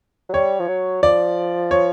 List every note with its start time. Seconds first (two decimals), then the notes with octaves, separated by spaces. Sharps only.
0.29 F#3
0.34 G3 C#5
0.60 F3
0.68 F#3
1.02 F3 D5
1.71 C#5